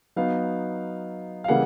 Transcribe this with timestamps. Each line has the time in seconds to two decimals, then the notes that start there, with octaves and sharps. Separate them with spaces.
0.16 F#3 B3 D#4 F5
1.44 F5
1.48 C#3 E3 G3 A#3 F#5